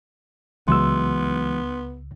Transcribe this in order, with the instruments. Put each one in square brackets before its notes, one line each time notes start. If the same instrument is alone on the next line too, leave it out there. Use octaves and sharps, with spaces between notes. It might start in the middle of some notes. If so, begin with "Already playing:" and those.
[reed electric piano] C#2 E6 [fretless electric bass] E3 F#3 G#3 [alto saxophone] B3 [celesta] C6